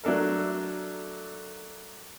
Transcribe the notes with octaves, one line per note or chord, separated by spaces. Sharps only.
F#3 A3 D4 A4 A#4